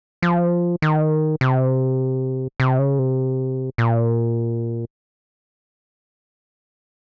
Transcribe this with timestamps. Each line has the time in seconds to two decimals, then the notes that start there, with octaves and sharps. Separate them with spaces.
0.22 F3
0.82 D#3
1.41 C3
2.60 C3
2.79 C#3
2.99 C3
3.78 A#2